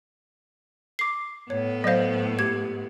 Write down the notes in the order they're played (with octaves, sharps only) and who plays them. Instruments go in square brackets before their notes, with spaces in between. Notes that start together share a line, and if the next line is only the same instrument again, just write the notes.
[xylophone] D6 C7
[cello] A2 B3 [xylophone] C#5
[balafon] F#3 C5 [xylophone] D#5 F5
[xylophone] G4 G#6